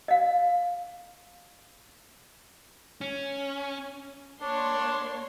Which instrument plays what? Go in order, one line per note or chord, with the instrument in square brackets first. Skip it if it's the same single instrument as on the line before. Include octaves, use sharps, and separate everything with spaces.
[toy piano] D#5 F5
[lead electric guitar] C#4
[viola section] A#3 C#5 C6 [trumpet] D4